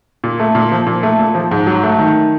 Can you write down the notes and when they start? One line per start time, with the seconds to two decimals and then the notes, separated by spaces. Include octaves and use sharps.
0.24 A#2
0.40 A3
0.55 A#2
0.72 F3
0.87 A#2
1.03 A3
1.19 A#2
1.35 F3
1.51 G#2
1.67 F#3
1.83 A3
1.99 D#3